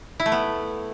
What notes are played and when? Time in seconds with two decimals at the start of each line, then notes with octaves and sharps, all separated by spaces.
0.20 E4
0.26 A3
0.32 B3